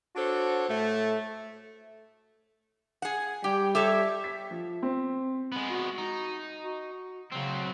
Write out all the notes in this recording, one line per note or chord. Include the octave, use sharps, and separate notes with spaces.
D4 F#4 A4 C5 C#5
A2 A3
G#4 F#5
G3 G4 G5
G4 A4 C#5 E5
B6
F3
C4
G#3 B3
F#4
D#4
F#4
C#3 F#3 C4